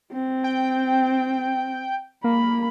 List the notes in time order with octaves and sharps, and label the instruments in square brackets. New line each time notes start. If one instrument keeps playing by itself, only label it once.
[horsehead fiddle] C4
[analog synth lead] G5
[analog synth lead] A#3 [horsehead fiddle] B5